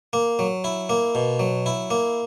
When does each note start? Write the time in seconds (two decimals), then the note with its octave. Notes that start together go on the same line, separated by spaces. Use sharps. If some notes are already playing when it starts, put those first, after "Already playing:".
0.13 A#3
0.39 F#3
0.64 E4
0.89 A#3
1.15 B2
1.39 F#3
1.66 E4
1.91 A#3